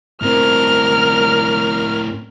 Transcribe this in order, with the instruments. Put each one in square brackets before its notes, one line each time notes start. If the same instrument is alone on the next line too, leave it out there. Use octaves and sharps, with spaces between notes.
[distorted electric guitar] A2 C4 [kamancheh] A#4 F6